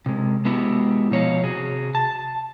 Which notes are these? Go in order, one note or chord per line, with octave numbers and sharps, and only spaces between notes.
C3 G#3
G#3 B3 E4 F#4 G4
B2 F3 C#5 D#5 F5
C3 F#4 G#4
A5